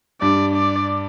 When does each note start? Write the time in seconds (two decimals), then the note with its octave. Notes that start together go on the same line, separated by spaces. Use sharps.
0.21 G2 D5
0.56 D5